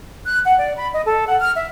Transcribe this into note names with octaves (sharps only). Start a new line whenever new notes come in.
F#6
F#5
D5
B5
D#5
A4
F#5
F6
E5